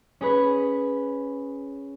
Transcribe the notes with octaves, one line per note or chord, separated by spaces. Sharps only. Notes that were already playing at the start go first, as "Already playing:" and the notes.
C#4 G#4 B4